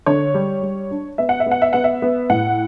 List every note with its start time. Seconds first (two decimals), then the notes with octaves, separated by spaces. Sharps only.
0.06 D3 C#5
0.34 G3
0.63 G3
0.91 D4
1.18 B3 E5
1.29 F#5
1.40 E5
1.46 B3
1.51 F#5
1.62 E5
1.73 B3 F#5
1.84 E5
2.02 B3
2.30 A2 F#5